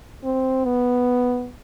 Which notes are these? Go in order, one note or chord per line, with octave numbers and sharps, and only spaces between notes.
C4
B3